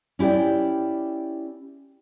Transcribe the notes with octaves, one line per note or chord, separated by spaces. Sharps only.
C#4 E4 G4 D5 G5